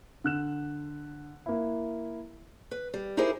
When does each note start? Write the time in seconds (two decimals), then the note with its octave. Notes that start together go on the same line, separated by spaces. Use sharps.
0.24 D3 F#6 E7
1.46 A#3 E4
2.71 B4
2.94 G3
3.17 D#4 E4 G4 G#4 A#4 C5